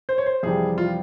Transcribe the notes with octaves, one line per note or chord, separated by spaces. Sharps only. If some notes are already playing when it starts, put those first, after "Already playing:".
C5
C#5
C5
F2 C3 E3 G3 G#4
F4